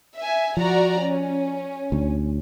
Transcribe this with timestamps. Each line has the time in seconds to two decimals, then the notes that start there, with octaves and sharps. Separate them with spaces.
0.16 E5 G#5
0.57 F3 F#4 D5 A#5
1.01 C#4
1.92 D2